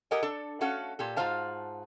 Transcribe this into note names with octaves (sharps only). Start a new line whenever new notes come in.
G4 A4 A#4 D#5 F#5 G#5
D4 A4
A3 C#4 F#4 A4 F5 F#5
A#2 G4 A4
G#2 F4 F#4 C5 F5 A5